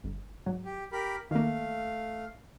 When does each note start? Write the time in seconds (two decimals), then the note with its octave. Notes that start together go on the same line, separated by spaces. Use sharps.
0.04 G1
0.46 G#2 F#3
0.65 G4
0.92 G4 A#4 B5
1.31 D#3 A3 A#3 F5